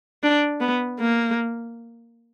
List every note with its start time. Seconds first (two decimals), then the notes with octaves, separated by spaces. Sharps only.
0.23 D4
0.61 B3
1.00 A#3